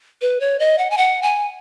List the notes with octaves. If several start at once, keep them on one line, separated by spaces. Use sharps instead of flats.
B4
C#5
D#5
F#5
G#5
F#5
G#5